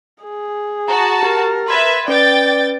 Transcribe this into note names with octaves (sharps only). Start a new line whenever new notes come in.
G#4
F#4 F#5 A5 A#5
G4 A#4 A6
B4 E5 C6 G#6 A6
C#4 B4 D5 G5 A6